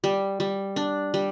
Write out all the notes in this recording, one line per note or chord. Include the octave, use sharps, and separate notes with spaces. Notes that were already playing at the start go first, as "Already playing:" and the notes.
G3
G3
D4
G3